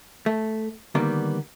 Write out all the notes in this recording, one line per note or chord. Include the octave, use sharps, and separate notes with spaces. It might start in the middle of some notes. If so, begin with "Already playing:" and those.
A3
D3 D#3 G3 A#3 B3